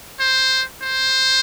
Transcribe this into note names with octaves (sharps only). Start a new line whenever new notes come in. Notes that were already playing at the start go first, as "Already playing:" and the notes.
C5
C5